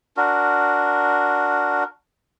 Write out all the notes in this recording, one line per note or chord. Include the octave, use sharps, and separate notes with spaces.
D4 F#4 A#4